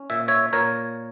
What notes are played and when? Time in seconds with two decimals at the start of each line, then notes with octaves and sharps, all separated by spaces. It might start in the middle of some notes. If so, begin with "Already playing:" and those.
Already playing: C#4
0.10 A#2 E5
0.28 C#5 E5
0.53 A#2 A#4 C#5